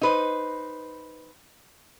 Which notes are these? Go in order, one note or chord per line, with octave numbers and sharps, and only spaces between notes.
D#4 B4 C5